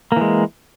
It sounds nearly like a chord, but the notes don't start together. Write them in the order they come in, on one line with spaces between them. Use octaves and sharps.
A#3 E3 G#3